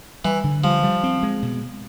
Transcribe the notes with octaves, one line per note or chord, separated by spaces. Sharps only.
E3 G3
D3
F3 G3
G3
C4
G#3
B2